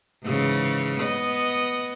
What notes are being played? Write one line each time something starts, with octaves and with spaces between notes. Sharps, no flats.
G#2 C#3 E3
B3 D#5